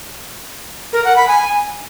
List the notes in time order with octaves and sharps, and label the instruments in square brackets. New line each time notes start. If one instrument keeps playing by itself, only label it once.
[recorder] A#4
F#5
B5
G#5